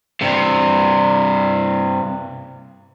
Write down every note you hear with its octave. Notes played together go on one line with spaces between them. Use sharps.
G2 C3